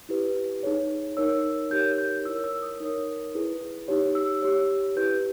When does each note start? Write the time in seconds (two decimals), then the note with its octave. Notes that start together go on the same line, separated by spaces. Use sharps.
0.09 E4 G4 B4
0.63 D#4 G#4 C#5
1.17 D#4 A#4 C#5 E6
1.71 D#4 G4 A#4 C#5 G6
1.98 G6
2.25 E4 A#4 C#5 E6
2.44 E6
2.62 D#6
2.80 D#4 A#4 C#5
3.34 E4 G#4 B4
3.88 D#4 G4 C#5
4.15 E6
4.42 G4 C#5
4.96 E4 G4 B4 G6